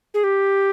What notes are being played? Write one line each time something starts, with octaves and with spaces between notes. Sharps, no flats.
G#4
G4